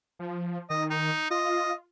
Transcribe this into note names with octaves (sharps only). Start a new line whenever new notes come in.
F3
D#3 D#5
D#4
F4 D#5